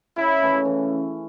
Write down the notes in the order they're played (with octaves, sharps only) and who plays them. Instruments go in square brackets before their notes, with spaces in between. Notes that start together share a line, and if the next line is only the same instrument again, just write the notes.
[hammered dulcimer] C#3 [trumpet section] E4
[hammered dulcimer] E3 A3 C#4
E3